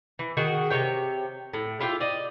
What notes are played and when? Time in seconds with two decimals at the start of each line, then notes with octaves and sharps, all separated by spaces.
0.19 E3
0.37 D#3 F#4 G#4
0.70 C3 G3 C#5 G5
1.54 A2
1.80 E4 F4 G4 F5
2.00 D5 D#5